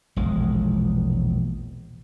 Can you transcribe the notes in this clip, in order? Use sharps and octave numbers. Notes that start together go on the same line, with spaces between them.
E1 A#1 G#3